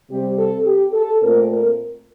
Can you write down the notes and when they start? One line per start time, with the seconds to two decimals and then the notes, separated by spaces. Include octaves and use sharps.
0.09 C3 G3 C4 G4
0.37 A4
0.65 G4
0.93 A4
1.21 A#2 A3 C4 A#4
1.50 A#4